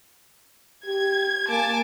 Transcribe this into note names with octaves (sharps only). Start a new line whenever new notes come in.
G4 G#6
A#3 G#5 A5 D6